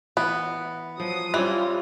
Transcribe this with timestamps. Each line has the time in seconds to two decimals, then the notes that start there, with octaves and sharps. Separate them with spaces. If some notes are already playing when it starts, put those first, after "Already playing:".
0.17 E3 B3
1.00 F3 F#3 D#6
1.34 E3 G3 C4 C#4 F4